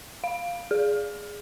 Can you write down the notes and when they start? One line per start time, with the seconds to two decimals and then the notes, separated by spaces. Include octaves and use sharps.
0.24 F5
0.71 G#4